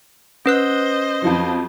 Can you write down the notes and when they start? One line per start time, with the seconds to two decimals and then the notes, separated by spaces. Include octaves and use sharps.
0.46 C#4 B4 C5 D#5 F#6
1.22 F2 F3 F#3